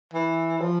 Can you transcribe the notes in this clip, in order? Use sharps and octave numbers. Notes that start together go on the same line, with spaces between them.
E3
F3